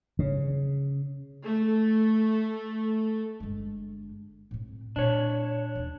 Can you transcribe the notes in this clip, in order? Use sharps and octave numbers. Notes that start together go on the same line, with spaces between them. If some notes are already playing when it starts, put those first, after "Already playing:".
C#3
A3 A4
G1 G#3
A2 C4
A#2 D4 C#5
D#2 E3